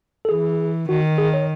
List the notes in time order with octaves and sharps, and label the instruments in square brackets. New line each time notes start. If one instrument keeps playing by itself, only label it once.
[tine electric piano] A4
[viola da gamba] E3 [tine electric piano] G#4
[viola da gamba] D#3 [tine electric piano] F#4
[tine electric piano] G#4
C#5